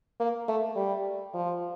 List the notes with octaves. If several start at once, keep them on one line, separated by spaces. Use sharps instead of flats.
A#3
A3
G3
F3